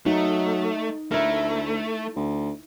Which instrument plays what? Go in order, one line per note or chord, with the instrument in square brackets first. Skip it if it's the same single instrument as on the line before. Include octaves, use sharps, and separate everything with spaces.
[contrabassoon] F#3 [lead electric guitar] A3 [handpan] D#4
[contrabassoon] D2 [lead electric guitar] A3 [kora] E4 A#4
[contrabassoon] D2